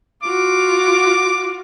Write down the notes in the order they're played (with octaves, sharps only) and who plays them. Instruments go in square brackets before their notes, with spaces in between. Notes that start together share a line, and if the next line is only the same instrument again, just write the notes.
[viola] F4 F#4 [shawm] D6